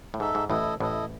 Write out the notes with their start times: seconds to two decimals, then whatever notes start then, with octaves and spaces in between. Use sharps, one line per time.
0.14 A2
0.20 G#2 D#4 A4 E5
0.35 G#2
0.50 A1 A2 E4 A4 D#5
0.80 A1 A2 E4 A4 D#5